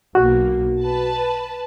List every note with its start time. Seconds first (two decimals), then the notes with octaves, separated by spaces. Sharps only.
0.15 B1 A#3 F#4
0.82 B4 A5